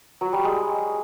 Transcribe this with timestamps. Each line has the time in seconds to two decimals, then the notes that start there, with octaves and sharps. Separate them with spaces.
0.21 F#3
0.33 G3
0.44 G#3